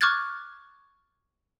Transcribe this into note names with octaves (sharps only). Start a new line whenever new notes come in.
C#6 D6 F6 F#6 G#6 A6